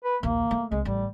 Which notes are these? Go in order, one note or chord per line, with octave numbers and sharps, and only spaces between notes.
B4
A#1 D#2 A#3
A3
C2 G#3
A1 G3